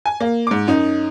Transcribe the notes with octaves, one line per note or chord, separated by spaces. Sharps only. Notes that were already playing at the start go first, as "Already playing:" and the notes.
G#5
A#3
G#2 D6
F#2 D#4